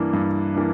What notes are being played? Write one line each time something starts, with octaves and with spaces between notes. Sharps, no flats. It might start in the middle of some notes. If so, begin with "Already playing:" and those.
Already playing: G2 E3 A#3 D4
G2
E3 A#3 D4